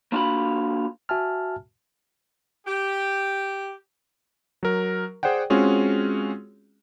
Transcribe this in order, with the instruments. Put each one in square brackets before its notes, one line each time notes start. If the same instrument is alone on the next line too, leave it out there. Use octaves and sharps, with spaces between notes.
[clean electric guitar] A#3 D4 F4 F#4 B5
[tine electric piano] F#4 E5 G#5 A5 F6
[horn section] G4
[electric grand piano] F#3 A#4
G#4 C5 D5 F#5 G5
G#3 C4 C#4 F4 F#4 G#4